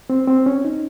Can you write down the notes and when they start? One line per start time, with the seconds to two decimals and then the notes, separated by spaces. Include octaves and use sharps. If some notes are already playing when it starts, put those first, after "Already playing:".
0.10 C4
0.28 C4
0.46 C#4
0.65 D#4